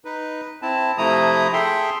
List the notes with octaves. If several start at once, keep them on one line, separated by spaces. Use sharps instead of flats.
D#4 B4
C4 E4 A5
C3 F3 A3 E4 A#5 D#6
G#4 A4 E5 G5 C6